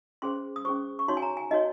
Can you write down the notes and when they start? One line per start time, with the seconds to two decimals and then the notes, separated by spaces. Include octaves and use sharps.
0.22 C#4 G#4 C5 C6
0.56 D#6
0.65 C#4 G#4 C5 C#6
0.99 C#6
1.08 D#4 F#4 C#5 C6
1.17 G#5
1.22 A#5
1.37 G#5
1.51 D#4 F#4 C#5 D#5